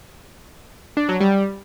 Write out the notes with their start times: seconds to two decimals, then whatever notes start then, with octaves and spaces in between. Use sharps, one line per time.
0.97 D4
1.09 F#3
1.21 G3